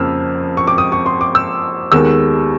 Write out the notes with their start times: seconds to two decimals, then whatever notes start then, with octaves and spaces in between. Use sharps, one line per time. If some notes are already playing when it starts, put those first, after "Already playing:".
Already playing: F2 C#3 F3 A#3 E6 F6
0.57 C#6
0.67 D6
0.78 D#6
0.92 C#6
1.06 C6
1.21 D6
1.35 E6
1.92 D#2 D#3 G#3 B3 E6